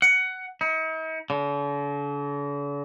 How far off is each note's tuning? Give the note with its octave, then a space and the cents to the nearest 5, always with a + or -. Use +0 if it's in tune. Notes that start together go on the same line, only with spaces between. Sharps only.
F#5 +15
D#4 +45
D3 -45